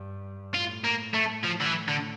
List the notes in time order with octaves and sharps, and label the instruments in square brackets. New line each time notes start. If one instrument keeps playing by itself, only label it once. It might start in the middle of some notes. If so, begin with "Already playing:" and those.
Already playing: [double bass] G2
[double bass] A2 [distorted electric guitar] F4
[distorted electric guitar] A#3
A3
F3
D3
E3
D3